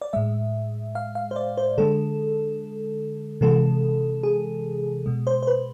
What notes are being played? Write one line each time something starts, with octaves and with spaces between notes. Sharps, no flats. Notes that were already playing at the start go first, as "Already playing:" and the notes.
D5
A2 G#3 E5
F5
F5
C5
D5
C5
D3 G#3 A4
C3 E3 G#3 A4
G#4
B2 G#3
C5
C5
B4